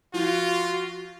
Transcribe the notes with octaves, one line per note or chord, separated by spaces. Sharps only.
F3 F4 F#4